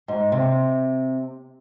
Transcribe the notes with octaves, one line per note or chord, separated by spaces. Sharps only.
G#2
C3